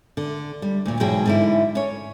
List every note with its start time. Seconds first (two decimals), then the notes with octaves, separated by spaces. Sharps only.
0.17 D3
0.62 G3
0.85 D2 A#2
1.00 E2 G#2 B2 F#3 G#4 G5
1.26 G#2 D3 E4
1.75 C#4 C#5